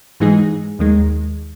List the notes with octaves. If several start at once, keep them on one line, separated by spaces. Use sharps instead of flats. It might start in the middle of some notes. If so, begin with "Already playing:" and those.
G#2 E3 G#3 D#4 G#4
D#2 D#3 G#3